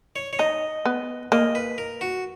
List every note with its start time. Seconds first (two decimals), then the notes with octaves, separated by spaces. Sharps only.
0.16 C#5
0.33 C#5
0.39 D#4 D#5
0.85 B3
1.32 A#3 D#5
1.55 B4
1.78 A#4
2.01 F#4